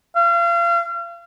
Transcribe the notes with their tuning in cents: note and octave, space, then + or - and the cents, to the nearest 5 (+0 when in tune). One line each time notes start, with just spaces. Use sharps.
F5 -35